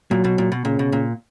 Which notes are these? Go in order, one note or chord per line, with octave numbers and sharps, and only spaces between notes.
A#2 F#3
B2
A#2
B2
A#2 C#3
B2
A#2